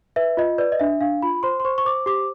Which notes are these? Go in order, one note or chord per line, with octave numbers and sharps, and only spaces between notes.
B4 E5
F4 D#5
B4 D5
D#5
D4 E5
D4 F5
F4 B5
C5 C6
C6
C5 C#6
C#6
C5 D6
G4 D6